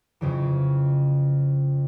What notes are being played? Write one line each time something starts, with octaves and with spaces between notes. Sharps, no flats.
F2 C#3 E3